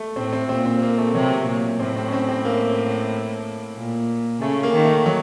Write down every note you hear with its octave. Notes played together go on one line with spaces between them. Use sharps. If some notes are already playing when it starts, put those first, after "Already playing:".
Already playing: A3
A2 C4
C4
A#2 C4
C4
A#3
A3
C3 F#3
A#2
A2 C4
C4
C#4
C4
C4
A#3
A#2
C#3 A3
A#3
D#3
A3
F#3